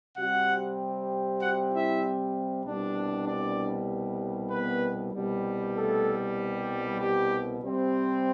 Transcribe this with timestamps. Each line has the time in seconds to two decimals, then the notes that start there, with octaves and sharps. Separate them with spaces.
0.17 C3 G3 C4 F#4 F#5
1.41 F#4 F#5
1.71 E4 E5
2.64 C2 B2 G3 D4
3.26 D4 D5
4.50 B3 B4
5.13 C2 B2 G3
5.74 A3 A4
6.99 G3 G4
7.61 C3 G3 C4